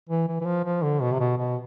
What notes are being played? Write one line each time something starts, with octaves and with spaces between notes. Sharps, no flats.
E3
E3
E3
F3
F3
D3
B2
C3
B2
B2